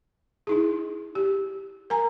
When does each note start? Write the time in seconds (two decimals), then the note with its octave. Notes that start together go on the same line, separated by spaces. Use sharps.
0.47 D#4 E4 G#4
1.15 G4
1.90 A#4 G#5 A#5